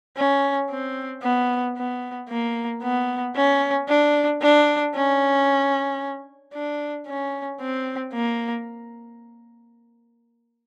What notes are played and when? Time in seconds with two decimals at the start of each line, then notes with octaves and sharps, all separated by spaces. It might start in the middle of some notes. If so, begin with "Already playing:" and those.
0.17 C#4
0.70 C4
1.23 B3
1.77 B3
2.29 A#3
2.83 B3
3.35 C#4
3.89 D4
4.42 D4
4.95 C#4
6.54 D4
7.07 C#4
7.61 C4
8.13 A#3